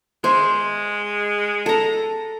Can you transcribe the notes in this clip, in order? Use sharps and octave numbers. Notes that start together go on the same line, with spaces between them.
G#3 C5 E5
A4 A#5